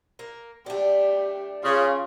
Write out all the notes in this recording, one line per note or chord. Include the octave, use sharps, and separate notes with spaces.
A#3
A3 D4 G4
C#3 F4